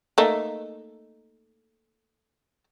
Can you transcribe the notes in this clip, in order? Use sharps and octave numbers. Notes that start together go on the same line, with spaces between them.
A3 A#3 D#4